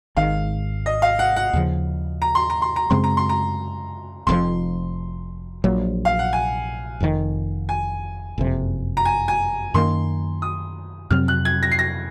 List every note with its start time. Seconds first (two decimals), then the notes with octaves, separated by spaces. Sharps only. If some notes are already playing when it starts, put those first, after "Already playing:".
0.17 G#1 G#2 D#3 F5
0.86 D#5
1.02 F5
1.19 F#5
1.36 F#5
1.53 D#2 C#3 F3
2.22 A#5
2.35 C6
2.50 A#5
2.62 C6
2.76 A#5
2.90 F#2 C#3 G#3 C4 C6
3.04 A#5
3.17 C6
3.29 A#5
4.27 F1 F2 C3 F3 C6
5.64 A#1 A#2 F#3 A#3
6.05 F5
6.19 F#5
6.33 G#5
7.00 F1 F2 C3 D#3
7.69 G#5
8.38 F#1 F2 C3
8.97 A#5
9.05 G#5
9.28 G#5
9.74 F#2 D#3 A#3 C6
10.42 D#6
11.11 F2 C3 F#3 C4 F6
11.28 F#6
11.45 G#6
11.63 A#6
11.71 C7
11.79 A#6